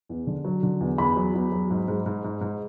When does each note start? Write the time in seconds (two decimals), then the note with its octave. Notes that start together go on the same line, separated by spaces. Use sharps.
0.09 E2
0.27 D3
0.44 F#3
0.63 D3
0.80 E2
0.98 E2 B5
1.16 F#3
1.34 E2
1.52 F#3
1.71 G#2
1.88 G#2
2.06 G#2
2.24 G#2
2.41 G#2